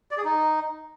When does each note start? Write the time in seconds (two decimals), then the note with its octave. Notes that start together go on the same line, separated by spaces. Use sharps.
0.11 D5
0.18 G#4
0.25 D#4